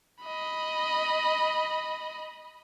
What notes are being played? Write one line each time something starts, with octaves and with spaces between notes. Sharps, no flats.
D#5 B5